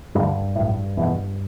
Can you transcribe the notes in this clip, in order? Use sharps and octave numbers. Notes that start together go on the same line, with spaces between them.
D2 G2 D3 G3
B1 A2
F1 E2 B2